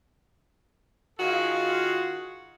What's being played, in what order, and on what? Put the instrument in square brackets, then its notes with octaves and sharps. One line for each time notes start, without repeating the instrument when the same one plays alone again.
[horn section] D#3 F4 F#4 G#4 F5